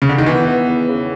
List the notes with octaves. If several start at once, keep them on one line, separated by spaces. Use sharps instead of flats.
C#3
D3
D#3
E3 B3
B3
E2
C#3